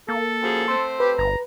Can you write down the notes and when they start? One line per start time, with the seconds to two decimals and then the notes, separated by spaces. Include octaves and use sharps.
0.09 A#3 A4
0.41 F#2 F3 G#4
0.68 A3 C4 C5 C6
1.00 G4 B4
1.18 G1 A#5